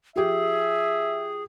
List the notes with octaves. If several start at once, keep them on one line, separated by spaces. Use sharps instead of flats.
F3 G4 G#4 E5